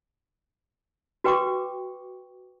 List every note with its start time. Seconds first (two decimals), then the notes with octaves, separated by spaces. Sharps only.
1.24 F#4 B4 G5 C#6 D6